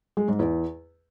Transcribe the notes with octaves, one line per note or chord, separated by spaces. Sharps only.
G#3
G#2
E2